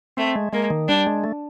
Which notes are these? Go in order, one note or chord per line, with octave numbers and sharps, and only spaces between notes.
A3 C4
G#3
G#3 A#3
D#3
G3 D4
G#3
A3